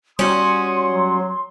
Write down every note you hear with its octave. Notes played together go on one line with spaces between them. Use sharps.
G3 C#4 F#4 C6 D#6
F#3